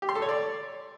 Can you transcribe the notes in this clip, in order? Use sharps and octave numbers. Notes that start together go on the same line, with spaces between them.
G4
C6
A4
C#5
D5